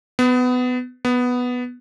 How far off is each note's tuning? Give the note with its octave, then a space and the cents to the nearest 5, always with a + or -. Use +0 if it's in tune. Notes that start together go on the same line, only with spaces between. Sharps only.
B3 +20
B3 +0